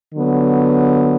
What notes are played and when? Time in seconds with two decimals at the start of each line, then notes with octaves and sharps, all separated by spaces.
0.13 D3 F#3 B3